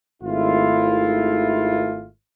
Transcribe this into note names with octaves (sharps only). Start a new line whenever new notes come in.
G#1 A3 E4 F4